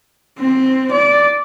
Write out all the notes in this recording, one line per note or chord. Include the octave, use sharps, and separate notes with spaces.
C4
D5